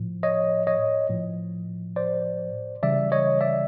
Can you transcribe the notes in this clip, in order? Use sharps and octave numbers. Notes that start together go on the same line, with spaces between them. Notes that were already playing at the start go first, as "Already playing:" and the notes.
Already playing: A2 F3
C#5 D#5
C#5 D#5
A2 F3
C5 D5
C#3 E3 G3 D5 E5
C#5 D#5
D5 E5